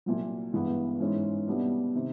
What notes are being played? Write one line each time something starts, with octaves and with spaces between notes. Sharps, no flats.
C2 A#2 F#3
G2 E3 G#3 B3
G#2 E3 G#3 C#4
C2 B2 G3 B3 D4
C3 D#3